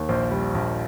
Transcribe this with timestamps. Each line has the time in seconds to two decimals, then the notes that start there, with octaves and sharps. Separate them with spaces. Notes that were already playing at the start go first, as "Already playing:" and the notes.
Already playing: D#2
0.09 A#1 C5
0.31 G3
0.54 A#1